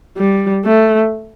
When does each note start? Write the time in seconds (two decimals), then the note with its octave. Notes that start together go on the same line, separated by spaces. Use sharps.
0.17 G3
0.65 A3